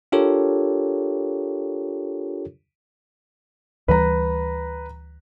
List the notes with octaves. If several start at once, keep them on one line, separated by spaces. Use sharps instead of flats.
D4 F4 G4 A4 A#4 C#5
D2 E3 G3 B4 A#5